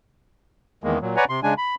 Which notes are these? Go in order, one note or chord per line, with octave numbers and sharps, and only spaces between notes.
E2 D#3 G#3 A#3
A#2 F#3
B4 C#5 D5 F#5 G#5 A#5
C3 C6
C#3 G#3 D4 G#5
B5